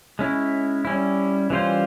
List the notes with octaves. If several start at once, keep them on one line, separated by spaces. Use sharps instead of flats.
G#3 C#4 E4
G3 C#4 E4
E3 G3 C#4 F4 C5